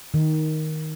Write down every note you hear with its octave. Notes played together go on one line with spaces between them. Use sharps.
D#3